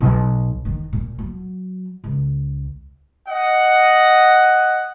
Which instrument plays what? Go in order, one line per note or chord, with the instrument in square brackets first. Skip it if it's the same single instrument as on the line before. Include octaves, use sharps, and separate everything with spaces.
[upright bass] B1
D#3
A#2
F#3
C#2
[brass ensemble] D#5 F#5